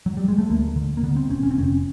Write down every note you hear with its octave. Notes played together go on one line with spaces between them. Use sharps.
F#3
G3
G#3
A3
D2 A#3
D3
A#3
D3 B3
C4
E1 C#4
C#4
C4
F1 C#4